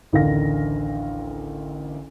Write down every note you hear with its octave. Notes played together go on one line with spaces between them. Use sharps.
A1 D2 D3 D#3 F5 A#6